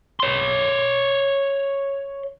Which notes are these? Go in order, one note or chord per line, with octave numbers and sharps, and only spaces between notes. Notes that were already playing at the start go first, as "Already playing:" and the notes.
C#5 C6